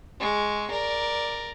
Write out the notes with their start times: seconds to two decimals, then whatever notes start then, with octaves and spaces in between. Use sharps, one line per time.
0.20 G#3 C#6
0.70 A#4 D5